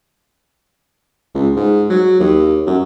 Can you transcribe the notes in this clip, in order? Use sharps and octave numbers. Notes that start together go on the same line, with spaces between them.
C#2
G#2
F#3
D#2
F#2